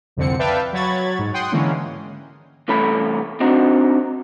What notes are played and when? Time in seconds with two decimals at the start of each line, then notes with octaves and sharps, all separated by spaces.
0.17 C2 F2 D3 C4 C#7
0.39 B4 D5 E5 F5 G5 A5
0.73 F#3 F#4 C#5 B5 G#6 A6
1.19 G#2
1.33 F#5 G5 C6 D#6
1.52 D3 E3 G#3 A#3 C#4
2.68 C2 E3 A3 C#4 A4 B5
3.40 C4 D4 D#4 F#4 C5